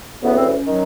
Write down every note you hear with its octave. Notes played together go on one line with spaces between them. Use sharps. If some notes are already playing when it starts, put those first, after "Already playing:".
D2 C#3 E3 B3
C4
C#4
D#3 F#3